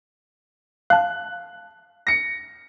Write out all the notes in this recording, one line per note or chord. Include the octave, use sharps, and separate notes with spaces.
F5 A5 F#6
A#6 C#7